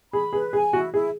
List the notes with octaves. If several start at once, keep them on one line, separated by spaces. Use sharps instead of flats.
G#4 B5
G#4 B4
G#4 G#5
E4 F#4
E4 G#4